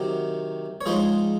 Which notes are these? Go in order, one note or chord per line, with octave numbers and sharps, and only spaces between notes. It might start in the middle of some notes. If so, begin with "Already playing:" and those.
Already playing: C3 D#3 F#3
C#5
F3 G#3 D#4 G#4 C5